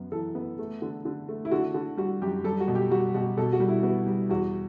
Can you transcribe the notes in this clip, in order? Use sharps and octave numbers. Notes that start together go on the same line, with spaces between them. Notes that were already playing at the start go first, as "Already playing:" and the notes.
Already playing: F#2 B3
E3 A4
B3
A3
D3
D3
A3
E4
D3 F#4
D3
G3 F#4
F#2 G4
G3 A4
F#4
B2
G4
G3 F#4
B2 F#4
B2 A4
F#4
G3
E4
B3 F#4
G3
E2 F#4